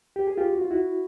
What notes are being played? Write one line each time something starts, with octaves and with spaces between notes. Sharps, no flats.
G4
G#4
F4 G4
F#4
F4
E4 F#4